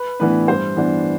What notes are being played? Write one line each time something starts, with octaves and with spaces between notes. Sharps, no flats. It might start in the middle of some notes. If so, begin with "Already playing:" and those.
Already playing: B4
A2 E3 B3 D4 B4
G2 C5
E3 B3 D4